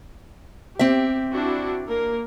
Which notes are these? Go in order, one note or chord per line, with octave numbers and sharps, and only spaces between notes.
C4 G4 E5
D4 E4 F#4
A#3 A#4